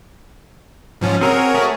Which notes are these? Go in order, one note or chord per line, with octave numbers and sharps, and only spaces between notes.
G#2 F3 C#4
C4 F#4 G#4 A#4 C#5
A3 G#4